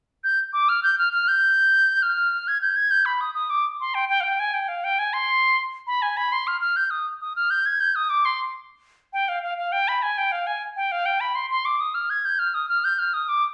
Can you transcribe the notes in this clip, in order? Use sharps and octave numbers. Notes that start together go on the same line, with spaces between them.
G6
D6
F6
G6
F6
F6
G6
F6
G#6
G6
G#6
G6
B5
D#6
D#6
D6
C6
G5
G5
F5
G5
G#5
G5
F5
G5
G#5
C6
B5
G#5
B5
C6
F6
F6
G6
D#6
D#6
F6
G6
G#6
G6
D#6
D6
C6
G5
F5
F5
F5
G5
B5
G#5
G5
F5
G#5
G5
F5
G5
B5
C6
C6
D6
D#6
F6
G#6
G6
F6
D#6
F6
G6
F6
D#6
D6